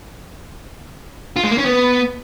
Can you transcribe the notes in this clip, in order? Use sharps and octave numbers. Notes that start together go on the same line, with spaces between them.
F4
G#3
A#3
C#4
B3